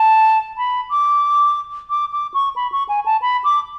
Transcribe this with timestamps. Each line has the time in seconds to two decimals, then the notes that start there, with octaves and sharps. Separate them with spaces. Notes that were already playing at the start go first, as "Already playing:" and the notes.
Already playing: A5
0.57 B5
0.90 D6
1.90 D6
2.12 D6
2.34 C#6
2.56 B5
2.72 C#6
2.89 G#5
3.05 A5
3.22 B5
3.44 D6